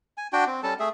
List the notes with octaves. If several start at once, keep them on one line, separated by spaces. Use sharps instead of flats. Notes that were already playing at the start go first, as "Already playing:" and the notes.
G#5
D4 F#4 G5
C4
G3 C#4 A4 A5
A3 G#4 E5